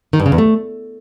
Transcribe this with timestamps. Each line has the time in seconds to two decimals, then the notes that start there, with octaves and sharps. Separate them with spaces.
0.13 D#3
0.20 G2
0.26 C#3
0.32 E2
0.38 A3